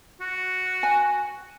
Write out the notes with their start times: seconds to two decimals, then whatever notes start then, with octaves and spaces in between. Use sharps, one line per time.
0.20 F#4
0.83 G#5